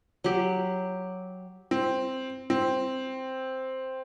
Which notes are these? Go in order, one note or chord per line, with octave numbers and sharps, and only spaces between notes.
F#3 G4
C4
C4